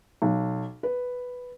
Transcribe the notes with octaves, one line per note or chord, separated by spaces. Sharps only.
B1
B4